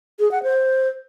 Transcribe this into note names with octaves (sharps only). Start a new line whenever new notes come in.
G#4
F#5
C5